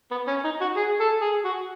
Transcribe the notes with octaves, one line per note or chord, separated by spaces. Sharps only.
B3
C#4
D#4
F#4
G#4
A4
G#4
F#4